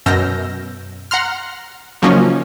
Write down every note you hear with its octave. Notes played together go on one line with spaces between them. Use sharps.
F#2 B2 E6 F6 G6 A#6
F#5 A#5 C6 F6
C#3 F3 F#3 A#3 C#4 D#4